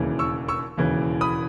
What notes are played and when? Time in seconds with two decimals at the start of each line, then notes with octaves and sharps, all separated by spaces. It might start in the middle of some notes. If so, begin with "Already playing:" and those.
Already playing: E1 D#2 C#3 E3
0.19 C#6 E6
0.49 C#6 E6
0.77 E1 D#2 C#3 E3
1.21 B5 D#6